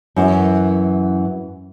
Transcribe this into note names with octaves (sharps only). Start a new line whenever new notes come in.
F#2 E3